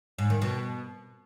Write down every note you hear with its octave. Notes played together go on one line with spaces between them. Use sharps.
G#2
D#3
B2